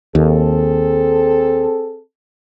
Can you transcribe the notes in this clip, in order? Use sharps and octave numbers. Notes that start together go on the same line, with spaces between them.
D#2 C4 G#4 A4